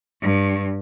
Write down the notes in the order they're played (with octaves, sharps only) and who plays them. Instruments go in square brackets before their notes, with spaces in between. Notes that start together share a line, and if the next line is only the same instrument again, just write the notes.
[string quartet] G2